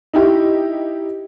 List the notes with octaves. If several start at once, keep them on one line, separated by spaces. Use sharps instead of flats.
D#4 E4 G4